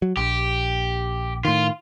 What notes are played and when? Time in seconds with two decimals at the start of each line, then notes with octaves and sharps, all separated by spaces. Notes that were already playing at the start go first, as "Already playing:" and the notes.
0.02 F#3
0.17 A#1 G4
1.45 A2 D#3 F4